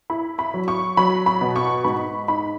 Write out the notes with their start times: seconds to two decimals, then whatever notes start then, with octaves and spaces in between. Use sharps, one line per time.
0.10 E4 B5
0.39 B5
0.54 F#3
0.68 C#6
0.97 F#3 B5
1.26 B5
1.41 B2
1.56 C#6
1.84 G#2 B5
2.28 D#4 B5